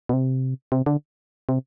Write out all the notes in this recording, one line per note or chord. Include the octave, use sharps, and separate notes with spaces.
B2
C3
C3
D3
C3